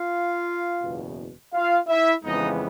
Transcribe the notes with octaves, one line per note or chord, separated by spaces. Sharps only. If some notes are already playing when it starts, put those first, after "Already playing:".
Already playing: F4 F5
F#1 E2 B2
F4 F5
E4 E5
F2 C#3 E3 G#3 B3 D#4 D#5